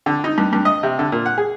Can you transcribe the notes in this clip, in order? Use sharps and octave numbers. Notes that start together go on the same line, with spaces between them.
D3
D#4
G2
G2
D#5
C3
D3
A#2
F#5
G#4